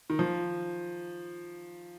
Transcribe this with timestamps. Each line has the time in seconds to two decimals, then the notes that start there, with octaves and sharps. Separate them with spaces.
0.10 D#3
0.19 F3